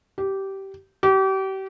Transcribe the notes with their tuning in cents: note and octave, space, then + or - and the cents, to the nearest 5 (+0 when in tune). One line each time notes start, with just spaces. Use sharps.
G4 -15
G4 -35